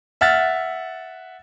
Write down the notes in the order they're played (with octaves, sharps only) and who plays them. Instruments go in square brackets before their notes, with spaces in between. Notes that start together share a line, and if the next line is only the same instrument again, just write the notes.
[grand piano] E5 F#5 F6 A6